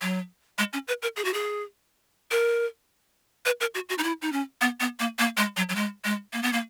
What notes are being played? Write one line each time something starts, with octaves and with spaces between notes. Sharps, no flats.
F#3
G#3
C#4
B4
A#4
G#4
F#4
G#4
A#4
B4
A#4
F#4
F#4
D#4
E4
D#4
C#4
B3
B3
A#3
A#3
G#3
F#3
F#3
G#3
G#3
A#3
B3
A#3